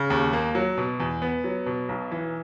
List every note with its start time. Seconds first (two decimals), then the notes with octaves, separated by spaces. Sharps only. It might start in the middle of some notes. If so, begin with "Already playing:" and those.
Already playing: C#3
0.10 D#2
0.33 A#3
0.55 F#3
0.77 B2
1.00 E2
1.22 B3
1.44 F#3
1.66 B2
1.89 B1
2.12 E3